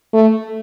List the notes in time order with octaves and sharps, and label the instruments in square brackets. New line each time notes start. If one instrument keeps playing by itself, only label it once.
[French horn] A3